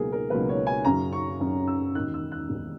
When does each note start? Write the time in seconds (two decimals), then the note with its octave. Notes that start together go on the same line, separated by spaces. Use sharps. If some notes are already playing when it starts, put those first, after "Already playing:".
Already playing: C#2 B2 F#3 A#3 G#4 A#4
0.12 A#4
0.30 C#2 B2 F#3 A#3 B4
0.49 C#5
0.67 G#5
0.85 F#2 C#3 F#3 C#4 A#5
1.13 C#6
1.40 F#2 C#3 F#3 C#4
1.68 E6
1.95 E1 D#2 D#3 F#6
2.14 E6
2.32 F#6
2.50 E1 D#2 D#3